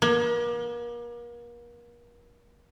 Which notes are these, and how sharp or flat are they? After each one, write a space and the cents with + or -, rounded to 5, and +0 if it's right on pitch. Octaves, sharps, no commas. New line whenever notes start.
A#3 +40